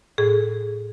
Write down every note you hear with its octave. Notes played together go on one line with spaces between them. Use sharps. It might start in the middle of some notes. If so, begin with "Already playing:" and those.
A2 G#4